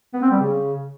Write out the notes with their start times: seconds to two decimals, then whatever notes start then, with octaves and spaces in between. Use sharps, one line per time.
0.14 B3
0.22 C4
0.31 G3
0.40 C#3